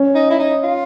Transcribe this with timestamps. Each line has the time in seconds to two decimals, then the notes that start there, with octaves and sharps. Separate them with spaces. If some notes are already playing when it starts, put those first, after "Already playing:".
Already playing: C#4
0.15 D#4
0.30 E4
0.39 D#4
0.63 F4